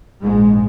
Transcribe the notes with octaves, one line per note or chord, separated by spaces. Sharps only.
A#1 G#2 G#3